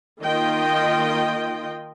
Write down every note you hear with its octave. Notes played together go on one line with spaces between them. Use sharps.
D#3 A#3 F4 D#5 G5